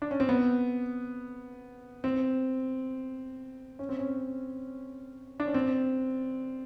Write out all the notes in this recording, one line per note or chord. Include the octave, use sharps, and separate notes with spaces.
D4
C#4
C4
B3
C4
C#4
C4
C#4
D4
C#4
C4